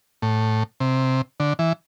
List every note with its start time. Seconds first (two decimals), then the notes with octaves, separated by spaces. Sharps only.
0.22 A2
0.80 C3
1.40 D3
1.59 E3